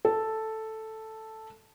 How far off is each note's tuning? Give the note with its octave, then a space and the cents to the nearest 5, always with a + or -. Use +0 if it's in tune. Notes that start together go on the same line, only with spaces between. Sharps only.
A4 +0